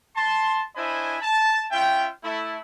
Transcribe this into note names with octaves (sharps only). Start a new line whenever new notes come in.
A5 C6
D4 E4 C5 D#5 G#5 B5
A5
C#4 F4 E5 G5
A3 E4